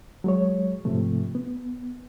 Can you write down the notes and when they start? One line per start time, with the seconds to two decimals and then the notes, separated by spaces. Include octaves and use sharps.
0.24 F#3 G#3 C#5
0.85 G#2 C3 F3 A3
1.35 B3